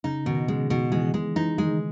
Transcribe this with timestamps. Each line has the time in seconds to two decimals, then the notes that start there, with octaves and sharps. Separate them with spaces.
0.04 C#3 D#4
0.26 B2 D#3
0.48 C#3 G#3
0.70 B2 D#3
0.92 E3 G#3
1.14 E3 G#3
1.36 E3 D#4
1.58 D#3 G#3